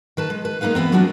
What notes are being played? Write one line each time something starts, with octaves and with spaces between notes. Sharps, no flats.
D#3 B4 A5
G#3
B4
G#3 A#3 D#4 B4 F5
E3 F#3 B3 C4
F#3 G#3 C#4 D4 F#4